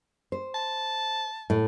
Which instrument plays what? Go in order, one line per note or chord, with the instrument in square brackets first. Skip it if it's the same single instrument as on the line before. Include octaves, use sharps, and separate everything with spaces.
[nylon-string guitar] C5
[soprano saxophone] A5
[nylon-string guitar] A2